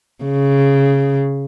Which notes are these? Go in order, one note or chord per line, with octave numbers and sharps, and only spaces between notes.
C#3